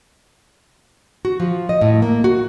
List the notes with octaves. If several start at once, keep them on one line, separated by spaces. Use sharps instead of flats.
F#4
F3
D#5
A2
A#3
F#4